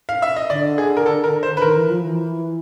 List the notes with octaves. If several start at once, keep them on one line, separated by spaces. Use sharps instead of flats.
F5
E5
D#5
D3 D5
G#4
A#4
A4
A#4
C5
B4
D#3 A#4
E3
F3
E3